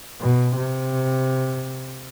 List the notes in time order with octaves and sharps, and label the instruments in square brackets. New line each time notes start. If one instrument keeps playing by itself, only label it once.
[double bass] B2
C3